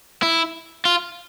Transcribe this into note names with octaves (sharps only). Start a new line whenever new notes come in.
E4
F4